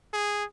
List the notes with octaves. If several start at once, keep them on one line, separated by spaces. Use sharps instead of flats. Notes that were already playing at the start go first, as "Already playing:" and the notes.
G#4